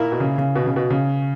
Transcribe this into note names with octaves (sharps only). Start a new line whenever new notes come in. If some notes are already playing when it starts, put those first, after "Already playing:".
Already playing: A#2 A#3 E4 A#4
B2
C#3
C#3
B2
C#3
B2
C#3